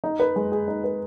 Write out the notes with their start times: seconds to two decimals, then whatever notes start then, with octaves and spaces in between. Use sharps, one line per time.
0.04 D#4
0.20 B4
0.36 G#3
0.52 G#4
0.68 D#4
0.84 B4